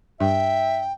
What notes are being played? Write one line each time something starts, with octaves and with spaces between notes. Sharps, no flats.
G2 E5 G5